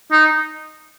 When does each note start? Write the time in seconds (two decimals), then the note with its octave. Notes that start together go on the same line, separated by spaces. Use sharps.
0.12 D#4